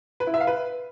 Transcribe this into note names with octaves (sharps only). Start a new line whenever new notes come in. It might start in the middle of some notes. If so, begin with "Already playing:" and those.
B4
E4
E5
F5
B4